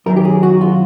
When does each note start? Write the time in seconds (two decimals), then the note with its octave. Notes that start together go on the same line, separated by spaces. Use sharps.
0.06 F#2 D#3 F#3 A#4
0.16 G4
0.25 G#4
0.43 F#4
0.61 F4